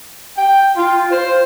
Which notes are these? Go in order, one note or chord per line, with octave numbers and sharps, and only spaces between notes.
G5
F4
C5